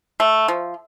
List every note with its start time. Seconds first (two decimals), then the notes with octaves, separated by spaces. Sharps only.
0.20 A3
0.48 F3